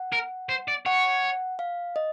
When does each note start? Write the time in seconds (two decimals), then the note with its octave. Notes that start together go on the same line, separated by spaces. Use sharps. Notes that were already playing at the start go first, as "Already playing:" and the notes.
Already playing: F#5
0.12 A#4
0.49 C5
0.68 D5
0.85 C#5 F#5
1.59 F5
1.96 D#5